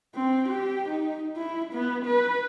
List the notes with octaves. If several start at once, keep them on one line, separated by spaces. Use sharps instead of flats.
C4
G4
D#4
E4
B3
B4